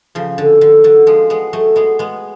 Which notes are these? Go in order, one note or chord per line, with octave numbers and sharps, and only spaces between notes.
C#3 F3
D3
D3
D3 F#3
F3 G#3
G#3 B3
F#3 A3
G#3 B3
G#3 B3